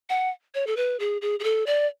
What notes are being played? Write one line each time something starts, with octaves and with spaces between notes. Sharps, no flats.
F#5
C#5
A4
B4
G#4
G#4
G#4
A4
D5